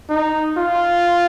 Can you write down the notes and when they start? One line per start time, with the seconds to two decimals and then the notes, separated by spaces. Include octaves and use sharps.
0.10 D#4
0.57 F4